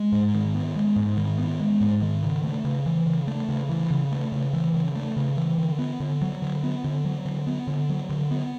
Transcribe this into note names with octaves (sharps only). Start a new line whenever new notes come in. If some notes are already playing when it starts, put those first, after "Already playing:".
Already playing: G#3
G#2
D#3
B3
G#3
G#2
D#3
B3
G#3
G#2
D#3
C#3
A3
C#3
E3
C#3
A3
C#3
E3
C#3
A3
C#3
E3
C#3
A3
C#3
E3
D3
B3
D3
F#3
D3
B3
D3
F#3
D3
B3
D3
F#3
D3
B3